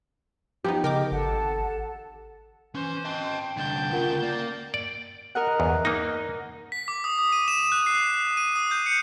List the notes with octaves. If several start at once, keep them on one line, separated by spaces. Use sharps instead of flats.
F3 B3 D#4 G4
C#3 A#4 D#5 G5 D6
G#1 A4 F#5 A5
E3 C#4 C5
D#5 G5 A5
C2 D3 A5 G6
D2 C#3 F4 A#4 F#5
A#3 D5
D5
A#4 D#5 F#5
E2
A#3 D#4
B6
D6
D#6
D#6
D#7
E7
F#6
C7
D#7
D#6
G6
C#7